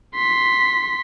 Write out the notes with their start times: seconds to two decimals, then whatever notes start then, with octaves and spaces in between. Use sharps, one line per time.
0.15 C6 B6